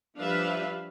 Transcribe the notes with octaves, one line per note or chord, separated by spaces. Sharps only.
F3 G3 D4 B4 E5 F5